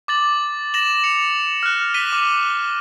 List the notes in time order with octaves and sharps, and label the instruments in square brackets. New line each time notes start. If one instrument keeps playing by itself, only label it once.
[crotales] D6 A6 F#7
A#6 E7 F#7
C#7 F7
F6 F#6
F6 B6 D#7 G7
D6